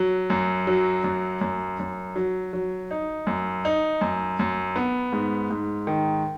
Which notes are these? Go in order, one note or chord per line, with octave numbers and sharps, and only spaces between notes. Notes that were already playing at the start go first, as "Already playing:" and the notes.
Already playing: F#3
F#2
F#3
F#2
F#2
F#2
F#3
F#3
D#4
F#2
D#4
F#2
F#2
B3
G#2
G#2
D#3